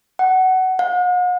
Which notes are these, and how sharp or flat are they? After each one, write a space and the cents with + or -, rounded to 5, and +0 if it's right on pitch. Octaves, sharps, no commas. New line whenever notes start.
F#5 +15
F#5 -45